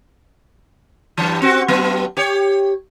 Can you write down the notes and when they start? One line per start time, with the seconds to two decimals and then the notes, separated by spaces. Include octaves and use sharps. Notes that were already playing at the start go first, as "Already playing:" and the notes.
1.18 G2 E3
1.42 C4 F#4
1.68 G2 F#3 B3
2.17 G4 C#5